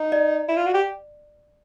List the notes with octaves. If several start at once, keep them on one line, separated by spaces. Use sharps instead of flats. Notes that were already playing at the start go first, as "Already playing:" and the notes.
Already playing: D#4
D5
E4
F4
F#4
G4